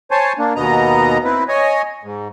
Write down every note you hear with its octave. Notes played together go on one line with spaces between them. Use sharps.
C5 C#5 G#5 A5
A#3 D4
D#2 B2 B3 D#5 A#5
C4 E4 B4
C#5 D#5 G#5
G#2